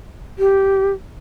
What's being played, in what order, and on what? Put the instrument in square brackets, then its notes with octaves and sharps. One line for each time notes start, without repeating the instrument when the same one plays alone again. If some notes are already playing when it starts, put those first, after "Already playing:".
[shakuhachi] G4